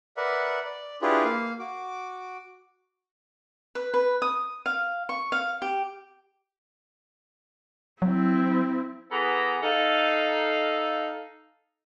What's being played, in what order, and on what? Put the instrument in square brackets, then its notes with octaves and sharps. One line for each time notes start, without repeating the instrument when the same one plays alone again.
[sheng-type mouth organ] A#4 B4 D5 E5 F#5
D5
D4 E4 F4 G4 G#4 B4
A#3 F5
F#4 D6
[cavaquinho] B4
B4
D#6
F5
C#6
F5
G4
[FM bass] F#3 [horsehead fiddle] C4 E4
[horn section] E3 B3 G#4 A4 A#5 B5
D#4 A4 F5